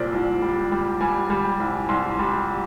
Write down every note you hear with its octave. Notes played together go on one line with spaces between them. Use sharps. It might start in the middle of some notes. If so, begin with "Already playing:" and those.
Already playing: C2 A#2 A#4 C5 D5
C2
G3
G3
G3 G#5
G3
C2
C2 C6
G3